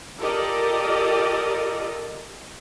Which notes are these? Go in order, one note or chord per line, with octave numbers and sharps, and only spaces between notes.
F4 G4 A4 A#4 D5 D#5